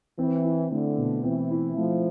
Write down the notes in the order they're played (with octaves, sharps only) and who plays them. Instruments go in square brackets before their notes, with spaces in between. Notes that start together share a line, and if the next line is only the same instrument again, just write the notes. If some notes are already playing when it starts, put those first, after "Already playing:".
[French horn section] E3 [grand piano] C4
[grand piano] E4
[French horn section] D3 [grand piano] A3
[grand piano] B2
[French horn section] E3 [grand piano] C4
[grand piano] E4
[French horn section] F3 [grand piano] A3